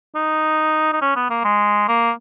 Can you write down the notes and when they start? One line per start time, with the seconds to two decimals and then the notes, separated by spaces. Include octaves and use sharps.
0.15 D#4
0.93 D#4
1.02 C#4
1.16 B3
1.30 A#3
1.44 G#3
1.88 A#3